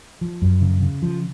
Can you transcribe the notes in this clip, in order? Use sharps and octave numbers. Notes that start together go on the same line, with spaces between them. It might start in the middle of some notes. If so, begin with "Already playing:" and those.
F3
F#2
C#3
C#3
F3